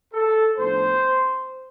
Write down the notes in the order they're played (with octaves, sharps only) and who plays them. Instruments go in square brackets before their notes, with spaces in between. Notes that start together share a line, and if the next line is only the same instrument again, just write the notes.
[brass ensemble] A4
A2 F3 B3 D4 C5